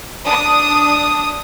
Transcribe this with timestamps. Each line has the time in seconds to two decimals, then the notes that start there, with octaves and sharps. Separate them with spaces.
0.24 D4 D#6